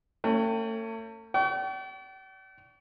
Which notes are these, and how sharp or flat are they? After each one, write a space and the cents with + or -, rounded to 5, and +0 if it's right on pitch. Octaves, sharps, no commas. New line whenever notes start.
A3 +40 C#4 -5 G5 -5
D5 -20 G5 -45 C#6 +35